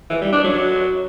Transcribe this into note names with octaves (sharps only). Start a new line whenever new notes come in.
E3
G3
D4
F#3